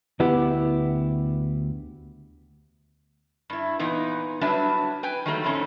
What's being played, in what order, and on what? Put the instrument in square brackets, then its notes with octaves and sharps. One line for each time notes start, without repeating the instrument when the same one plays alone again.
[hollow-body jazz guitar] D2 B3 E4 G4
[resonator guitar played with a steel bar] G2 E4
A#2 E3 B3 D#4
F#3 G3 D4 B4 E5 A5
B4 G5 G#5
D#3 F#3 G3 A3 A#3
F2 A2 A3 C4 C#4 D#4